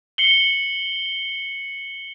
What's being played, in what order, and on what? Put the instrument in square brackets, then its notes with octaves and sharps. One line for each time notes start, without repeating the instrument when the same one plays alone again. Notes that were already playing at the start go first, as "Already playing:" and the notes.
[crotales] C7 C#7 F#7 G7